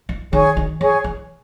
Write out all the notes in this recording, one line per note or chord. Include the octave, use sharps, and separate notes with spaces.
E3
D#3 G#4 C#5 G#5 C#6
D#3
E3 G#4 C#5 G#5 C#6
E3